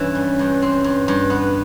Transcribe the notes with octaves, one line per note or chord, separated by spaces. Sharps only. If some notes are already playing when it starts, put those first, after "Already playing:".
Already playing: G2 E3 C#4
G3
G2
C4
G2
G2
B3